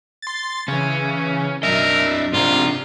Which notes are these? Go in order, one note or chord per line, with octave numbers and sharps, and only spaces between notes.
C6 A6
C#3 E3 C#4
B1 F#2 D4 A#4 D#5 E5
G#2 C3 D4 F4 A#4